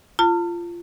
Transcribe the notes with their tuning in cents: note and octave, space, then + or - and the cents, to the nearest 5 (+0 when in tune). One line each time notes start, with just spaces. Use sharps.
F4 -20 A5 +40